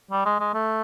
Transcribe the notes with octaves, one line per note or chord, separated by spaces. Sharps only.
G3
G#3
G#3
A3